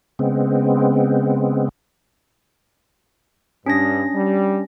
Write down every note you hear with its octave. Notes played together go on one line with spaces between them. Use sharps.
C#3 G#3 B3 C4
G2 C#4 D4 A#6
G3